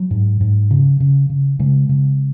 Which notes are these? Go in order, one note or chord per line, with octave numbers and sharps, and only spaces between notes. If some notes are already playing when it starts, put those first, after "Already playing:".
Already playing: F#3
G#2
G#2
C#3
C#3
C#3
C#3 G#3
C#3